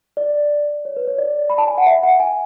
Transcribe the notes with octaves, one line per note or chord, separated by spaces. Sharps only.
D5
C#5
B4
C#5
D5
B5
A5
G#5
F#5
E5
F#5
G#5